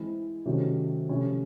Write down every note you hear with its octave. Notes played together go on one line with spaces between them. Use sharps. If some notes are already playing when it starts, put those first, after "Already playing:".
Already playing: E3 G#3 C4 E4
C3 D#3 F#3 A3 C#4
C3 F3 A3 C#4